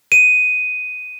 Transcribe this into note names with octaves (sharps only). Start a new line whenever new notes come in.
D#7